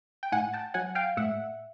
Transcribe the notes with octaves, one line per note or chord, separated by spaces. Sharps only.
G5
A2 F#5 G#5
G5 A5
F#3 F#5 G#5
F5 G5
A2 E5 F#5